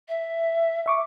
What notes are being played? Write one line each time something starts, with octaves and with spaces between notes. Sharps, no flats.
E5
E5 C#6 D6